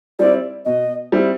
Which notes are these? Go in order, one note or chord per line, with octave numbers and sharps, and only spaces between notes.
G3 C4 E4 D5
B2 D#5
G3 C4 E4